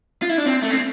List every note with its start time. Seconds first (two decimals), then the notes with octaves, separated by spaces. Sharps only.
0.22 F4
0.29 E4
0.38 D4
0.46 C4
0.62 A3
0.70 C4